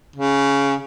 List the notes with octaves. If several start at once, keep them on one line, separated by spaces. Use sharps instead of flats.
C#3